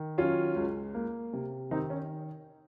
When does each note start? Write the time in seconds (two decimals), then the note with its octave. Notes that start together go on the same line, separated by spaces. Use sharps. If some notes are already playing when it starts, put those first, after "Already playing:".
Already playing: D#3
0.18 F#3 C#4 F4
0.56 C#2
0.94 A#3
1.33 C3
1.71 D#3 C4 D#4
1.90 C#4